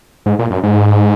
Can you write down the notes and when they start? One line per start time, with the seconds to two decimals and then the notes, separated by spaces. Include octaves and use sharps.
0.26 G#2
0.39 A#2
0.51 F#2
0.63 G#2